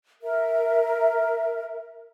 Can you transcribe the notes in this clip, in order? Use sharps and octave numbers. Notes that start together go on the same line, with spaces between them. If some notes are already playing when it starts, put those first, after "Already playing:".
A#4 E5